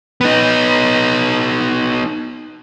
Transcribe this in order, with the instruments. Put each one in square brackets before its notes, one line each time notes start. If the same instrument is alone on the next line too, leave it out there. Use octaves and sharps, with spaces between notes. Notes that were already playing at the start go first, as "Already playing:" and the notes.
[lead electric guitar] B3 D#4